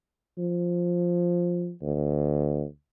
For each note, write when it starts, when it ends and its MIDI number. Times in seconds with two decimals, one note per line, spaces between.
0.38 1.72 53
1.82 2.65 38